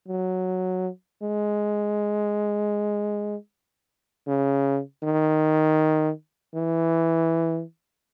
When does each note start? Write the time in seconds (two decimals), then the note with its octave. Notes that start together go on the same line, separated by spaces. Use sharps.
0.08 F#3
1.22 G#3
4.27 C#3
5.03 D#3
6.55 E3